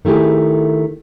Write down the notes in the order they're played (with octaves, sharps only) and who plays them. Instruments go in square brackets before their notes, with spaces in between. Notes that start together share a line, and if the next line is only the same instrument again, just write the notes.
[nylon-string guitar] D#3 A3 E4 G4 G#4